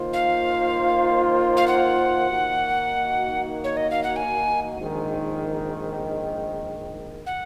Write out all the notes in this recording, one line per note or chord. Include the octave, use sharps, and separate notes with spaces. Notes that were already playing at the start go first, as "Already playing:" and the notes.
Already playing: D#3 A#3 F4 C5
F5
F5
F#5
D#3 A#3 D#4 F#4
C#5
D#5
F5
F#5
G#5
A#1 G#2 D#3
F#5